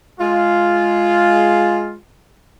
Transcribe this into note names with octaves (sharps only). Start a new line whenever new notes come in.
G#3 F4